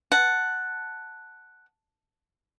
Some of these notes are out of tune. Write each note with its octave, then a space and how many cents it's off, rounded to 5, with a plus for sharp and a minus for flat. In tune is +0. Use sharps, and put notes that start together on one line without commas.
F#5 +0 A5 +0